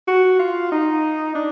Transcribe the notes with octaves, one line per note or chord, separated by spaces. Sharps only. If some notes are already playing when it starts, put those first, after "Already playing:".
F#4
F4
D#4
D4